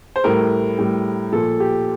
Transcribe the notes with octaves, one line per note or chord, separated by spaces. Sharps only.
C5
A2 G3 A#4
A2 G3
A#2 F3 A4
G4